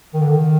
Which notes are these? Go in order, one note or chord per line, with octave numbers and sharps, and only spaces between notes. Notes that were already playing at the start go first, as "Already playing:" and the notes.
D#3
D3
D#3